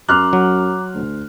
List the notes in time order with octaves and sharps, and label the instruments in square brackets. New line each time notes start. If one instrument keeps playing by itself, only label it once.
[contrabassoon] F#2 [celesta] A#5 D6 [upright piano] C6 F6 F#6
[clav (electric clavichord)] F#3
[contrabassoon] D2